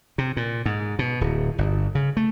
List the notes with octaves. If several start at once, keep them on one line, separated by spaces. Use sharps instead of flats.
C3
A#2
G#2
B2
D1
G1
C#3
A3